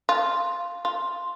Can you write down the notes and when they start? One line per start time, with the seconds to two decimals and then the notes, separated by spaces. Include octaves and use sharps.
0.09 F4
0.85 F4